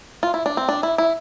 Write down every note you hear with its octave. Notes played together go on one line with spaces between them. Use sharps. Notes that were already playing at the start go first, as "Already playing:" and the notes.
F4
E4
D4
C4
D4
E4
E4